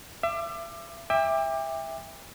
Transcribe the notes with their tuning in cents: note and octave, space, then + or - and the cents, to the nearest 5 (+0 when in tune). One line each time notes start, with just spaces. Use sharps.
E5 +35 D6 +20
E5 -5 G5 +35 D6 +10